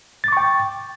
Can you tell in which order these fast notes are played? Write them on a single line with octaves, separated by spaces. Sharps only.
A6 D6 C#6 G5